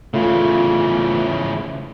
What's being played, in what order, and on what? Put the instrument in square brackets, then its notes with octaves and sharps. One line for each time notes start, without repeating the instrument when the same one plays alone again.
[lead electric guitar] C#3 E3 [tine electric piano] A3 F4